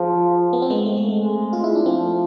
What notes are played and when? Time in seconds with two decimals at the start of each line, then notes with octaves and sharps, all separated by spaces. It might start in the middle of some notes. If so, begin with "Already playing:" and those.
Already playing: F3 G#4
0.53 B3
0.62 C4
0.70 G#3 B3
0.86 A3
0.97 G#3
1.09 A3
1.19 G#3
1.53 F4
1.64 E4
1.75 D4
1.86 F3 A3 C4